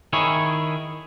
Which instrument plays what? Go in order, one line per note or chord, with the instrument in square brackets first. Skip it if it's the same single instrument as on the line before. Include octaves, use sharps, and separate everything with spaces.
[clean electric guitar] D#3 E4 G#4 C#5